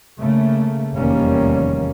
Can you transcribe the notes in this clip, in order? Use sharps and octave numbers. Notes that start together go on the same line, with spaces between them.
C#3 A3 A#3
F1 E2 D#3 G3 A#3 C#4